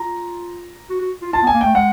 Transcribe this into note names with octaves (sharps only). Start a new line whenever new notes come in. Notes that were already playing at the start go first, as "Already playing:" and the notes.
Already playing: F4 A#5
F#4
F#4
F4
F4 A5
B3 G#5
A#3
A3 G5
G#3 F#5